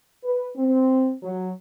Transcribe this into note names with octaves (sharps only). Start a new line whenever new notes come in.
B4
C4
F#3